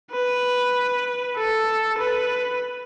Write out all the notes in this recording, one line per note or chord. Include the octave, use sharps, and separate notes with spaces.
B4
A4
B4